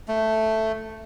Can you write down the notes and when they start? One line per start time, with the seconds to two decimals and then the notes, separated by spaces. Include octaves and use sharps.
0.08 A3